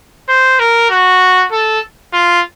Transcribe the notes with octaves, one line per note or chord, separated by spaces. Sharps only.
C5
A#4
F#4
A4
F4